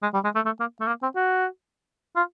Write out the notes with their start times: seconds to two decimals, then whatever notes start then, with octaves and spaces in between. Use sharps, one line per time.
0.03 G#3
0.14 G3
0.24 G#3
0.35 A3
0.46 A3
0.60 A#3
0.80 A3
0.88 A#3
1.03 C4
1.16 F#4
2.16 F4